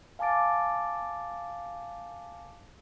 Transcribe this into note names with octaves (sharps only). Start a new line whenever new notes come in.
F5 G#5 A5 D6 A6 D7